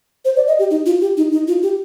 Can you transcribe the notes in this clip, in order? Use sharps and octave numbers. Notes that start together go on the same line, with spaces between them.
C5
D5
D#5
G4
D#4
F4
G4
D#4
D#4
F4
G4